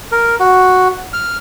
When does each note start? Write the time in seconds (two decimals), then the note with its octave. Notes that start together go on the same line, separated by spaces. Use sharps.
0.12 A#4
0.40 F#4
1.13 F6